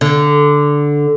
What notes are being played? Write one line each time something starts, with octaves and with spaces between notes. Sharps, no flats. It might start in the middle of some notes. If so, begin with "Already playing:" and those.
D3